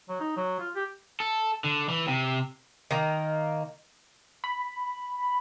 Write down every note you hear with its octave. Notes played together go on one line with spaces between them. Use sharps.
F#3
D#4
F#3
F4
G4
A4
D3
E3
C3
D#3 A#3
B5